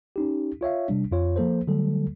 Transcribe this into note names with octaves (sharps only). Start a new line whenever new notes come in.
C#4 D#4 G4
F4 C#5 E5 F5
C3 G3 D4
F2 F4 C#5
F3 A#3 A4 C5
D3 F#3 G3 A3 A4